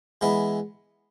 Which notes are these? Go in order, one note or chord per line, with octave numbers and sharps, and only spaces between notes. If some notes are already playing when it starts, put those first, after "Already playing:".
E3 G#3 B3 E4